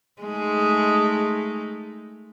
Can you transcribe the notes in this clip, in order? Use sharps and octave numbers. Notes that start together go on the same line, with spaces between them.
G#3 A3 D#4